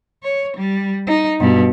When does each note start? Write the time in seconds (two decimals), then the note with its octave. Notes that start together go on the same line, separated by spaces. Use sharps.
0.23 C#5
0.56 G3
1.07 D#4
1.40 G2 B2